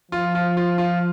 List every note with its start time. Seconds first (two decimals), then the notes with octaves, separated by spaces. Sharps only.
0.12 F3 F4
0.35 F4
0.57 F4
0.78 F4